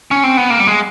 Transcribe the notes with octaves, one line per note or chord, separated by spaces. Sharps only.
C#4
C4
B3
A#3
G3
G#3